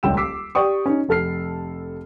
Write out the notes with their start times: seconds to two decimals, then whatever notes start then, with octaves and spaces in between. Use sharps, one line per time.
0.03 D#1 C#2 G3 G5 E6 E7
0.17 D6 E6 B6 C7
0.55 G4 D5 G5 C#6 D#6
0.86 C#4 D#4
1.09 F1 A4 F6 C7